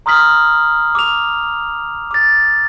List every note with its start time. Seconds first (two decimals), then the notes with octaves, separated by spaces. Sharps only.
0.06 A#5 C6 D#6 F6 B6 F#7
0.95 D6 F7
2.11 D6 A6